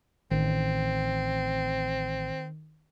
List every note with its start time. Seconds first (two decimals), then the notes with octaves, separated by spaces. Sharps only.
0.31 A1 D#3 C4